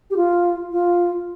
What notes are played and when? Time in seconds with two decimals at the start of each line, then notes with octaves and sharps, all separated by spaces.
0.10 G4
0.17 F4
0.72 F4